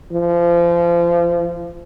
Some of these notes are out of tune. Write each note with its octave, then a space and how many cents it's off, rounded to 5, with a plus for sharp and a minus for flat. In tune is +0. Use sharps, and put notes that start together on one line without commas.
F3 -30